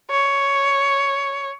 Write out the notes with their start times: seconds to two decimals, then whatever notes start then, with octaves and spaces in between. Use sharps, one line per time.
0.11 C#5